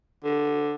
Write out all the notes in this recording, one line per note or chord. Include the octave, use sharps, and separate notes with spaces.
D3